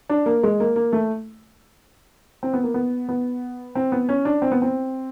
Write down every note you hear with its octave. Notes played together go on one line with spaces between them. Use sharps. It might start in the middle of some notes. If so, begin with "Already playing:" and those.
D4
A#3
G#3
A#3
A#3
A3
C4
B3
A#3
B3
B3
C4
B3
C#4
D4
C4
B3
C4